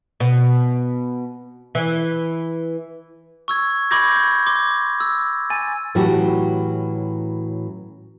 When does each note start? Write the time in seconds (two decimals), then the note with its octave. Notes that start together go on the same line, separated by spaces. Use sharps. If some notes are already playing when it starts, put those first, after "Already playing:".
0.20 B2
1.75 E3
3.48 C#6 E6 G#6
3.91 B5 C#6 D6 G6 G#6 A#6
4.16 G6
4.46 C6 D6
5.00 E6
5.50 G#5 A6
5.95 A2 E3 F#3 C#4 F#4 G4